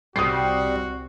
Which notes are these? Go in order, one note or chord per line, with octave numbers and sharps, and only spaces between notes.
C2 C3 G3 C4 F#4 D#6 C7